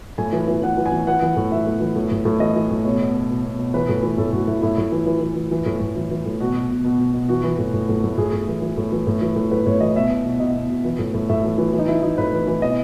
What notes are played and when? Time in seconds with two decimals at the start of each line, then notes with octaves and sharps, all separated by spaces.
0.18 A2 G#5
0.33 E3
0.48 E3
0.62 E3 F#5
0.77 E3
0.86 G#5
0.92 E3
1.07 E3 F#5
1.22 E3
1.37 A2
1.52 E3 E5
1.66 A2
1.81 E3
1.96 A2
2.11 A2
2.25 A2
2.40 E3 D#5
2.56 E3
2.71 A2
2.84 B2 C#5
3.00 B2
3.14 B2
3.29 B2
3.44 B2
3.58 B2
3.74 E3 B4
3.89 A2
4.03 E3
4.18 A2 A4
4.33 A2 F#4
4.47 A2 E4
4.62 A2 E4
4.78 A2
4.92 E3
5.07 E3
5.21 E3
5.36 E3
5.51 E3
5.66 A2
5.80 A2
5.96 E3
6.11 E3
6.26 A2
6.40 B2 F#4
6.54 B2
6.70 B2
6.84 B2
6.99 B2
7.14 B2
7.28 E3 F#4
7.44 E3
7.58 A2
7.73 A2
7.89 A2
8.04 A2
8.18 A2 G#4
8.33 A2
8.48 E3
8.62 E3
8.77 A2
8.92 E3
9.07 A2
9.22 E3
9.36 A2
9.51 A2 B4
9.67 A2 C#5
9.81 E3 D#5
9.96 B2 E5
10.10 B2
10.25 B2
10.40 B2 D#5
10.55 B2
10.70 B2
10.85 E3
10.99 A2
11.14 A2
11.29 A2 E5
11.44 E3
11.58 E3
11.74 E3
11.79 D#4
11.88 E3 E4
12.03 E3 D#4
12.18 A2 B4
12.33 E3
12.47 E3
12.62 B2 D#5